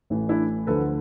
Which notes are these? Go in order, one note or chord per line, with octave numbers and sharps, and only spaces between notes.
A1 A2 E3
D4 E4
D2 D3 F3 A4 B4